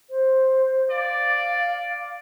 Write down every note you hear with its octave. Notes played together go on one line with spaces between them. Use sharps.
C5
D5 F5